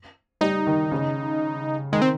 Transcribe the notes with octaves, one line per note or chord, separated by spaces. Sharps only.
G3 D#4
D#3
C#3
D#3 G#3
C4